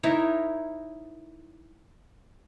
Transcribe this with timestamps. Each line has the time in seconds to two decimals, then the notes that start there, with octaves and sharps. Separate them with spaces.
0.03 D#4 E4 A#4 C#5